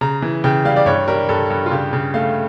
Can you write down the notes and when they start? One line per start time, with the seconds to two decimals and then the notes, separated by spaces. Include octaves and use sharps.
0.01 C#3 A#5
0.22 E3
0.44 C#3 G5
0.65 G3 F5
0.76 D5
0.86 G2 C#5
1.08 G3 A#4
1.29 G2 A4
1.50 G2
1.66 F4
1.71 C#3 G4
1.93 C#3
2.14 A3 F5